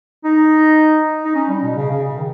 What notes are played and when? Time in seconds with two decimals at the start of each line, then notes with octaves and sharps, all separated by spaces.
0.24 D#4
1.24 D#4
1.35 C#4
1.49 G3
1.63 B2
1.76 C#3
1.90 C#3
2.08 C#3
2.18 D#3